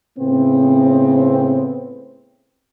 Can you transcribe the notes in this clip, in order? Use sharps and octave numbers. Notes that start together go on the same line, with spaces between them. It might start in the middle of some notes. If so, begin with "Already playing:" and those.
A2 C#3 B3 C4